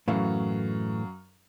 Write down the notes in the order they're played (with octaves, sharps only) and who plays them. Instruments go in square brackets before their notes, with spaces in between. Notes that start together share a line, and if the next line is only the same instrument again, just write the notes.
[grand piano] F#2 C#4 F5 [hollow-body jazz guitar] A2 E3 A3